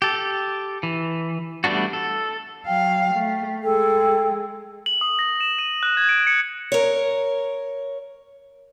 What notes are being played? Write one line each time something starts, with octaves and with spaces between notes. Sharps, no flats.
G4 A4
E3
G3 A3 B3 D4 F#4
A4
F#3 F5 G5
A3
G#3 G#4 A4 G5
F#7
D#6
A#6
E7
D#7
F#6
G#6
D7
C#7
A#4 C#5